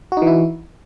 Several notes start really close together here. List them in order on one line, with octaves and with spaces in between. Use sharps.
F#4 D#4 E3 E4